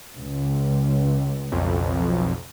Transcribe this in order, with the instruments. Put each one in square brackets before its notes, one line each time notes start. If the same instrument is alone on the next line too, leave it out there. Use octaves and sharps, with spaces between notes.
[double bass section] C#2
[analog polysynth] B1 F2